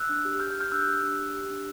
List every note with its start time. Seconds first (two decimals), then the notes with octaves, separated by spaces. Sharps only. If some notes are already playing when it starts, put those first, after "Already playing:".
Already playing: E6 F#6
0.09 D4
0.25 G4
0.40 G4 F6 G6
0.50 F6 G6
0.55 G4
0.60 F6 G6
0.72 D4 E6 F#6
0.87 G4
1.03 D4
1.19 G4
1.34 G4
1.50 D4